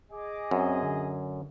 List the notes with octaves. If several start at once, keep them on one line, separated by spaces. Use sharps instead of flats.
G#4 D#5 D6
F#2 C4
D3